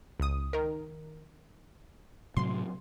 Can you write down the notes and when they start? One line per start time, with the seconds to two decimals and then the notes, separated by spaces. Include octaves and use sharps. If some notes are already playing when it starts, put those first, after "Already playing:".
0.20 C#2 D#6
0.53 D#3 A#4
2.37 A2 C3 F#3 C6